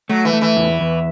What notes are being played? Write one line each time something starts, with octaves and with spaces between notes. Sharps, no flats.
F#3 A3
E3
A3
E3
E2
E2